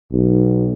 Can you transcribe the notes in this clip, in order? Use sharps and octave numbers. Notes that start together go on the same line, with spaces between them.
B1